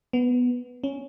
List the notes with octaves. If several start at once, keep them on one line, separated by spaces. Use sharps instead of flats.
B3
C#4